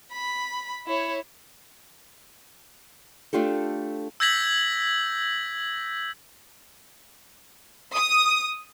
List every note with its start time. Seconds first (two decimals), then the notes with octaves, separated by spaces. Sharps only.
0.12 B5
0.86 E4 C#5
3.33 A3 D4 F4 G4 A4
4.20 E6 G6 G#6 A#6 B6 F#7
7.94 D#6